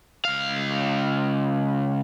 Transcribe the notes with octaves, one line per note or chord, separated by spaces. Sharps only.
C#2 F5